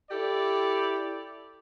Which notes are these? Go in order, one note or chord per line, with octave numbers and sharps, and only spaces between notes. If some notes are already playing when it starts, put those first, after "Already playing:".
E4 G4 A4 D5